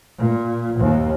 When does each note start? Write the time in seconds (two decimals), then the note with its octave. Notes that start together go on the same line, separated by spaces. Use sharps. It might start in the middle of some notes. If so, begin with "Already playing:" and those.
0.19 A#2
0.80 D#2